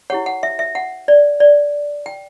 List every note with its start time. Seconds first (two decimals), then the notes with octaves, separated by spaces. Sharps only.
0.10 E4 G4 C#5 F#5
0.26 F#5
0.43 E5
0.59 E5
0.75 F#5
1.08 D5
1.40 D5
2.06 G5